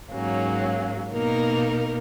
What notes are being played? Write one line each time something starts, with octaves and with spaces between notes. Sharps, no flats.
G#2 F#3 A#3 C#4
B2 A#3 D#4 A#4